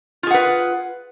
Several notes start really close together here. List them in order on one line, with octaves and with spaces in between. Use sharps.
F4 G#4 F#5 B4